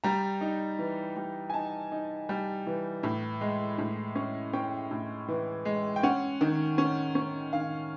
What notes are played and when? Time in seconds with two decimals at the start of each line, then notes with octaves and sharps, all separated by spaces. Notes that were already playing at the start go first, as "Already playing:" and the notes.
0.04 G3 A#5
0.41 D#4
0.79 E3
1.17 G3
1.50 G#5
1.54 D#4 A5
1.92 D#4
2.29 G3
2.67 E3
3.03 A2
3.41 G#3
3.78 A2
4.15 C#4
4.53 C#4 G5
4.91 A2
5.28 E3
5.65 G#3
5.96 G5
6.03 C#4 F#5
6.41 D#3
6.78 C#4
7.15 C#4
7.53 D#3 F5